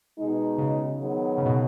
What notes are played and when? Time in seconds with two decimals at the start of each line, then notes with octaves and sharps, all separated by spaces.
0.18 B2 G#3 D#4
0.58 C#3
0.98 D#3 F#3 B3 D#4 G#4
1.38 C#3
1.45 B2